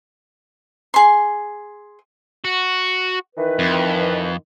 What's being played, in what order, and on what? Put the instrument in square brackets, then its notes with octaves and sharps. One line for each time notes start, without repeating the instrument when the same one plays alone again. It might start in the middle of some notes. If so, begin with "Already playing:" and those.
[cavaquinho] G#4 C6
[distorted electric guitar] F#4
[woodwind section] D#3 E3 B4
[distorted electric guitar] F2